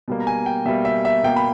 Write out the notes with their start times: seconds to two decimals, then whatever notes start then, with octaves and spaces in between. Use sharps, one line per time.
0.08 B2 G3 A#3
0.20 A#5
0.27 G#5
0.46 G5
0.65 B2 G3 A#3 E5
0.85 E5
1.05 E5
1.24 B2 A#3 G5
1.36 B5